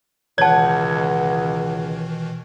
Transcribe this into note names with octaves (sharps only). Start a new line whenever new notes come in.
C#2 B2 D#3 E3 C#5 F#5 A5 G#6